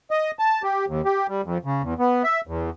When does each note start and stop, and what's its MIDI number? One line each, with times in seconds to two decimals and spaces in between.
0.11 0.31 75
0.39 0.62 81
0.63 0.85 67
0.88 1.02 39
1.05 1.27 67
1.29 1.41 55
1.44 1.58 41
1.65 1.82 49
1.82 1.94 40
1.99 2.23 59
2.24 2.41 76
2.47 2.70 40